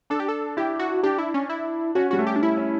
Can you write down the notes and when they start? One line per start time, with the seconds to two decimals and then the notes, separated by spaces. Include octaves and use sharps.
0.10 D4 A4
0.20 G4
0.29 A4
0.57 E4 G4
0.79 F#4
1.03 D4 G4
1.18 E4
1.34 C#4
1.50 E4
1.95 C#4 F#4
2.11 G3 F#4
2.19 A3
2.27 G4
2.36 D4
2.41 C#4 E4
2.57 C#4